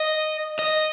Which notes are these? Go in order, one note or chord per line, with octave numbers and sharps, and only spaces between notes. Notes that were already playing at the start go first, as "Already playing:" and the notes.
Already playing: D#5
D#5